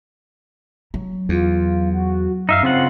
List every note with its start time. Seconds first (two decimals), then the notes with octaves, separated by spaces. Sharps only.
0.94 F#3
1.29 E2 F4
1.93 F#4
2.49 F#2 D#4 E5 F5
2.63 C#3 C4 F4 F#5